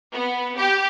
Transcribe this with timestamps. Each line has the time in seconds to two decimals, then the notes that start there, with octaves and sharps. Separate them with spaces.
0.13 B3
0.56 G4